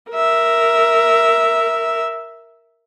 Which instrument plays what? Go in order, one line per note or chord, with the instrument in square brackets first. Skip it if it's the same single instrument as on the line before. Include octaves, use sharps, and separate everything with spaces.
[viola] A#4 E5